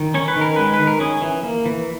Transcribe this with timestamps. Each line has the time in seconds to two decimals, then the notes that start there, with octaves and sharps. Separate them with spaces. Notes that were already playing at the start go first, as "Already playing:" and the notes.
Already playing: D#3
0.14 C#4 C#5
0.28 B4
0.36 D#3 A#4
0.56 G#3 B4
0.74 B4
0.79 D#3
0.87 A#4
1.00 C#4 G#4
1.22 E3
1.43 A#3
1.66 E3